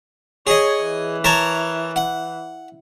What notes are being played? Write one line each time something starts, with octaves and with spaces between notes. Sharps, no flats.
G#4 C#5 D#5
E3
A#4 C#5 A5
F#5